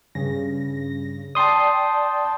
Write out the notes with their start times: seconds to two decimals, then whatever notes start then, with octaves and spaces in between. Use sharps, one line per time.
0.15 G2 C#3 A#6
1.35 D5 G5 A5 C6 D#6